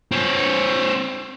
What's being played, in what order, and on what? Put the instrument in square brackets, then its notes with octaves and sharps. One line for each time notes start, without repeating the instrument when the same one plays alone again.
[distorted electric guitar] C4 C#5